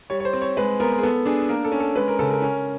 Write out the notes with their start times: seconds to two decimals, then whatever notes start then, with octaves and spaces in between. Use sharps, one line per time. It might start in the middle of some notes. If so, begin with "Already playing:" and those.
0.10 G3 C#5
0.20 C#5
0.25 C5
0.33 C4
0.42 C#5
0.57 G#3 B4
0.80 B3 A#4
0.99 G#4
1.03 B3 A4
1.25 D4 G#4
1.49 A#3 A#4
1.65 A4
1.72 C#4
1.80 A4
1.96 G#3 B4
2.08 A#4
2.19 C#3 A4
2.30 A#4
2.42 C#4